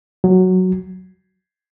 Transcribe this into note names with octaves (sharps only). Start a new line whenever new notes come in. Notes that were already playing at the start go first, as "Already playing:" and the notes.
F#3